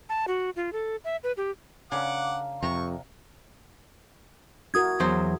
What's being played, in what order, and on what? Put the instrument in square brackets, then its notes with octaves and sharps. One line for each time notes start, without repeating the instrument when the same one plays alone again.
[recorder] A5
F#4
F4
A4
E5
B4
G4
[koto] C#3 [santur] D4 A#4 F5 [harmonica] F#5 D6
[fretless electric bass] F2 [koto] C3 A#5 [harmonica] C#6
[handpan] E4 F#4 A#4 [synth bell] D#6 G#6
[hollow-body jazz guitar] E2 F#3 C5